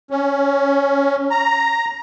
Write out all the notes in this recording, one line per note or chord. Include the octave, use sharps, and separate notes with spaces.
C#4
A#5